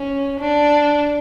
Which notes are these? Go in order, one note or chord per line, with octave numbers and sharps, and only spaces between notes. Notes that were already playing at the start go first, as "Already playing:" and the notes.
Already playing: C#4
D4